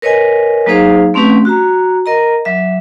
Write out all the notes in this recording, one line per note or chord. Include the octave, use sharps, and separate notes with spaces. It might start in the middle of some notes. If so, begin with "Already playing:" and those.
A#4 B4 C#5 D#5 G#5
F#3 A#3 D#4 G#4 C5 F5
A3 C4 C#4 G4 B4
F#4 A#5
A#4 D#5 A#5
F#3 E5